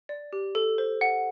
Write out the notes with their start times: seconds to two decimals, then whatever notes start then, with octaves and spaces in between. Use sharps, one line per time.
0.09 D5
0.33 G4
0.55 A4
0.78 C5
1.01 F#5